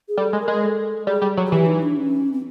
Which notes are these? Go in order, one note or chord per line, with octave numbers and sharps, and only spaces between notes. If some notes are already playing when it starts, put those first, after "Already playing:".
G#4
G3 A4
G#3
A#4
G#3
A4
G3 G#4
G3
F#3
F#4
E3 G4
D#4
D4
C#4
C4